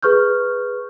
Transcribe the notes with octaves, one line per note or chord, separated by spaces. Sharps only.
G#4 B4 C#6 F6 G6